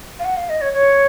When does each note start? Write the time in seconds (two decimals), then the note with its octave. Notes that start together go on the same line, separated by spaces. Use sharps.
0.19 F5
0.25 F#5
0.36 F5
0.49 D#5
0.61 C#5
0.73 C#5